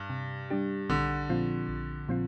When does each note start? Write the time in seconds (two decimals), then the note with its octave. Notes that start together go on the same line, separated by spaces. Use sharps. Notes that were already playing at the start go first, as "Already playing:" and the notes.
Already playing: G2
0.10 C3
0.50 G3 D4 G4
0.89 A#1 D3
1.29 A#2 F3 C4 F4
1.68 A#1
2.09 A#2 F3 C4 F4